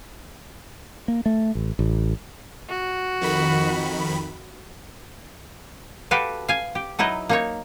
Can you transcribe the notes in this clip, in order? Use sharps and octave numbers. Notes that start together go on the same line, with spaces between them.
A#3
A3
A1
A1
F#4
F2 D#3 B5
F#4 G4 A4 B4 F5
F5 G#5
G4
F#3 D#4 E4 B4 D#5
A#3 D#4 C#5